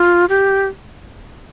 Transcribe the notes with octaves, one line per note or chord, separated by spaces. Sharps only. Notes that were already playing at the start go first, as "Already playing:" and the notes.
Already playing: F4
G4